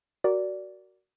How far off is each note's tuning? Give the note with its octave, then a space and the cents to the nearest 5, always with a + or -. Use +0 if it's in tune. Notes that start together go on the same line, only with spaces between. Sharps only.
F#4 +15 A#4 +0 D5 -10